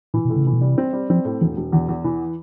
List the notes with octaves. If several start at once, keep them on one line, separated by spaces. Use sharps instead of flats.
A#2 E3
B2
A2
C#3
C3 E3
B2
C3 G3
C4
G3
F3 C4
A2
E1 E3
E1
E2 D#3
E2
E3